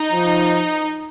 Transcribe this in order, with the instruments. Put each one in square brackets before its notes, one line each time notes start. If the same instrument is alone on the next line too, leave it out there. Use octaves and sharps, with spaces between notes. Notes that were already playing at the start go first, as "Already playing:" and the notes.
Already playing: [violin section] D#4
[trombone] F3